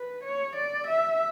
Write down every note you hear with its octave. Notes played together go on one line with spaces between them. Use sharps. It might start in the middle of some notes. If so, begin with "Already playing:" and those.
Already playing: B4
C#5
D5
E5